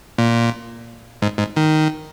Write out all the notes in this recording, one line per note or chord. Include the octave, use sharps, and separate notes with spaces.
A#2
G#2
G#2
D#3